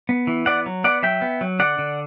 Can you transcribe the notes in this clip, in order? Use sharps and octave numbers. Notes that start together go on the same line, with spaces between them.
B3
E3
B3 D5 F#5
F#3
B3 D5 F#5
F#3 E5 G5
B3
F#3
D3 D5 F#5
D3